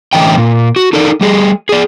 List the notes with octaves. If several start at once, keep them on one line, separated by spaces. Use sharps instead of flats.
A2 D3 E3 C#4 D#5 G5
A#2
F#4
D#4 A4 A#4 D5
G3 A3 G#4
G#4 D5